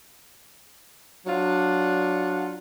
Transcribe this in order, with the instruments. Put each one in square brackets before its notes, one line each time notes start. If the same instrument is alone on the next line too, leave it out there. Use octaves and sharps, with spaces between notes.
[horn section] F#3 D4 F4 F#5